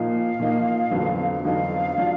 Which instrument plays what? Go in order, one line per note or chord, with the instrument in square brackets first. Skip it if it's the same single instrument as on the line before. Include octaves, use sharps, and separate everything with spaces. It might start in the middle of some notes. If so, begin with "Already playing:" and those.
Already playing: [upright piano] A#2 F3 A#3 D#4 [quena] F5
[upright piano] A#2 F3 A#3 D#4
F2 D3 F#3 B3 D#4
[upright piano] F2 D3 F#3 B3 D#4 [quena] F5
[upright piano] F#3 D4 F4